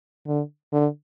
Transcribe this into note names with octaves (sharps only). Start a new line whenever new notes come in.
D3
D3